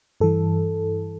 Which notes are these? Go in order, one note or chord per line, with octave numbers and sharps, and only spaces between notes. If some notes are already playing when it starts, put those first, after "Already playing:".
G2 E3 A4